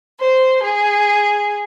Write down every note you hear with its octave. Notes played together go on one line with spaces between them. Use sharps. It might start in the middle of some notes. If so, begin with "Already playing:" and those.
C5
G#4